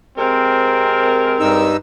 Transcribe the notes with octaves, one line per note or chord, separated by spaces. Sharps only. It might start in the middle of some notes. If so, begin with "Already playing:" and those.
C3 G#3 C4 A#4
G2 D#4 E6